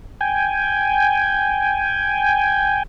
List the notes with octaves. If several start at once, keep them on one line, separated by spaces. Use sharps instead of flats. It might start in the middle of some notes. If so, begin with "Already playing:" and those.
G5 G#5